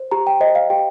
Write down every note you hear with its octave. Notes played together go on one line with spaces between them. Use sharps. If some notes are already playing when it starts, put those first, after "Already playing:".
Already playing: C5
G4 A#5
G5
C5 D#5
F5
G4 G5